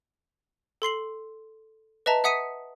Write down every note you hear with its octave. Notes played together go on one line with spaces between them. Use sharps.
A4 C6 C7 F#7
B4 D#5 E5 A5 A#5
E5 F#5 D#6 B6 C#7 D#7